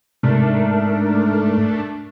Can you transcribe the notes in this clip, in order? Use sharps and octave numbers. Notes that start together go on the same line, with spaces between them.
G#2 C3 A3 D4 A#4